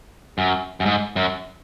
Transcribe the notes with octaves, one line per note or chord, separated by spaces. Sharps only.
F#2
F#2
G#2
F#2